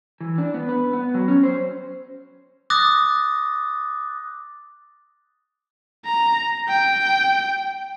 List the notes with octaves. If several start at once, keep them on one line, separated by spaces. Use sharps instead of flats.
E3
D4
B3
B4
B3
F#3
C#4
C5
D6 D#6 F#6 A6 A#6
A#5
G5